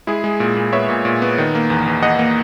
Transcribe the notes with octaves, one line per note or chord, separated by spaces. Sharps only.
G#3 E4 G#4
G#3
A#2
A#2
B3 C#5 E5
A#2
A#2
B3
D#3
A#3
E2
E2
E2 D#5 F#5
A#3